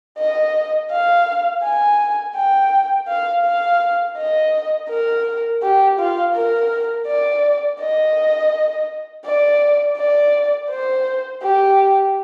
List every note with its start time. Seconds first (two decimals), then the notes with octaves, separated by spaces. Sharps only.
0.18 D#5
0.91 F5
1.63 G#5
2.36 G5
3.08 F5
3.44 F5
4.17 D#5
4.90 A#4
5.62 G4
5.99 F4
6.35 A#4
7.07 D5
7.80 D#5
9.26 D5
9.97 D5
10.70 C5
11.43 G4